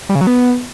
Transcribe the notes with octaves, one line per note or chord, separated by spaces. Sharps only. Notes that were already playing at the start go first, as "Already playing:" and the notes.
G3
C#3
F#3
B3